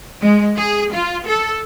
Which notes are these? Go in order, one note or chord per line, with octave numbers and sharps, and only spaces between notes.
G#3
G#4
F4
A4